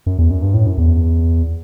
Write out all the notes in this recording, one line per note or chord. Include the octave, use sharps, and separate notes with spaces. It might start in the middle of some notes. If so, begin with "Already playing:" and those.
F#2
E2
F#2
G2
A2
F#2
E2